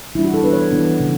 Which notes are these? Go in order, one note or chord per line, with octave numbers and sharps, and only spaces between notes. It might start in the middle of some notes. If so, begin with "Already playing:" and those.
E3 G3 D4 E4
F#4
A4
E3 B3 D4 B4
C#5
E3 B3 D4
C#3 E3